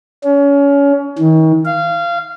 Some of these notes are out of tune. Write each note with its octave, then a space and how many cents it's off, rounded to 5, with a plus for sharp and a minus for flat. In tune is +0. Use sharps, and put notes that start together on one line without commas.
C#4 +30
D#3 +40
F5 -20